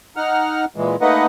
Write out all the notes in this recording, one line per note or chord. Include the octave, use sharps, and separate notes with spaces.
D#4 F#5 F6
A#2 E3 G#3
A3 A#3 D#4 B4 D#5 F#5